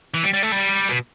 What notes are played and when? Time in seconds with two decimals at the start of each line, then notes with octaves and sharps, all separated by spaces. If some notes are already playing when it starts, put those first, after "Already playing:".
0.14 E3
0.23 G3
0.34 G3
0.43 A3
0.52 G3
0.89 B2